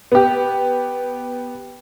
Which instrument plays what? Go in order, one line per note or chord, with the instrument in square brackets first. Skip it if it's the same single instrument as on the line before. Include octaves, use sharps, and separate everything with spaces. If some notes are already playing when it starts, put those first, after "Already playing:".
[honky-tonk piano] B3 G4